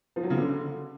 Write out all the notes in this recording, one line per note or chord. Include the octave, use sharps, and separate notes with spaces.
F3
F#3
C#3
D3